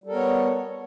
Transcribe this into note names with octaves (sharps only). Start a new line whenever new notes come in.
G3 B3 A4 A#4 C#5